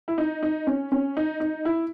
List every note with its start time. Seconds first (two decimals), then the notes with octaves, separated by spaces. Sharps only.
0.08 E4
0.18 D#4
0.43 D#4
0.67 C#4
0.92 C#4
1.17 D#4
1.40 D#4
1.65 E4